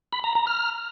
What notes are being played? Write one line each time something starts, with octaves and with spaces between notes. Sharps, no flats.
B5
A#5
A#5
F6